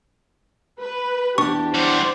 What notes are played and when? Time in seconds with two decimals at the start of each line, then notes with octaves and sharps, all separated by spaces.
0.80 B4
1.38 E2 D4 G4 C#6
1.74 G3 F#4 C5 D5